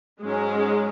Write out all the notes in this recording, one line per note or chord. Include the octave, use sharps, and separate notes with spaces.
G#2 F#3 G#3 C#4